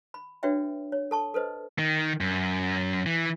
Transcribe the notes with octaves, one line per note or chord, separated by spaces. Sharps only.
B5
D4 F#4 B4 C#5 E5 G5
C#5
A4 A5 C#6
A4 B4 C5 D#5
D#3
F#2
E3